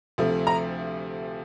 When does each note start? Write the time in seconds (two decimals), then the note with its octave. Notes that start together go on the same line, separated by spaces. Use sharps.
0.18 D2 C3 F3 A3
0.47 A#5